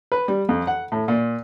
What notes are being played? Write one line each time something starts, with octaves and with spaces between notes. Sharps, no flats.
B4
G3
F2
F#5
A2
A#2